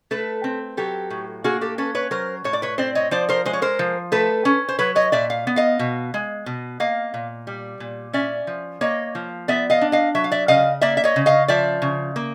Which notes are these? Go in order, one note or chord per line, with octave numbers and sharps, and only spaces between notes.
A3 A4 B4
C4
F#3 G4 A4
A2
A#3 F#4 G#4
G4 A4
C#4 A4 B4
B4 C#5
F#3 A#4 C5
A2 C#5
D5
B4 C#5
C4 C5 D5
C#5 D#5
F3 C5 D5
A#4 C5
G#3 C5
C#5
A#4 C5
F3
A3 A4 B4
C#4
C5
F#3 B4 C#5
C#5 D#5
A#2 D5 E5
F5
B3
D#5 F5
B2
G#3
B2
A#3 D#5 F5
A#2
G3
A#2
C#4 D5 E5
F3
A#3 C#5 D#5
F3
B3 D5 E5
D#5 F5
D4
D#5 F5
F#3 E5
F5
D5 E5
C#3 D#5 F5
A#3 D5 E5
E5
C#5 D#5
C#3
D#5 F5
F3 D5 E5
C#3
A#3